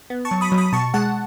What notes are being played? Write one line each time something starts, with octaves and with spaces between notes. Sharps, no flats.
B3
A5 C#6
F#3
B5 D#6
F#3
B5 D#6
B2 A5 C#6
G#3 F#5 A5